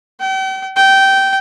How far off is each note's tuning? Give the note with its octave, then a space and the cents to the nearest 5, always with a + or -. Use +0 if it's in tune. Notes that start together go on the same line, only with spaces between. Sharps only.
G5 -40
G5 -15